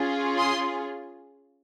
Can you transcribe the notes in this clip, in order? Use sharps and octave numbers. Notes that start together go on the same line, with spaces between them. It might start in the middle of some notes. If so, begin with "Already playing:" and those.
Already playing: C#4 F4 G#4
C6 D#6